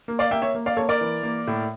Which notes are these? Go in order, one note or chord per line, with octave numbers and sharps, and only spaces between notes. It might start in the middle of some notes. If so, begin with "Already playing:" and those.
A#3
D5 F5
A#3 E5 G5
C#5 E5
A#3
D5 F5
A#3 A4 C#5
A#4 D5
E3
A#3
A2